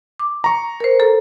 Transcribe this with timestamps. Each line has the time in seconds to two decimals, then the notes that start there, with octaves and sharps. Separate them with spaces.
0.19 D6
0.44 A#5 C#6
0.80 A#4 C5
1.00 A4 A#5